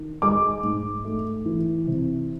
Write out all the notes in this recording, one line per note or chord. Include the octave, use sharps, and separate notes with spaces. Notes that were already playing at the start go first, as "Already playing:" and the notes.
Already playing: D#3
G#3 D6
G#2
A3
E3
C3